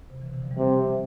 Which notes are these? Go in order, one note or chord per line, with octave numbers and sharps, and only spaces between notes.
C3
E3
B2 D3
C3 E3
D3 F3
E3 G3
C3